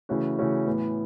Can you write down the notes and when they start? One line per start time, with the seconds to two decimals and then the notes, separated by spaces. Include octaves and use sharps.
0.09 C#3 E3 A3 C#4 F#4
0.38 C#3 E3 A3 C#4 F#4
0.67 A2 E3 B3